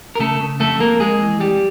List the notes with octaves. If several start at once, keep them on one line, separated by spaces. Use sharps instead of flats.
A#4
C#3 A3 A4
C#3
F2 A3 A4
F2 A#3 A#4
F2 G#3 G#4
E3
F2 G3 G4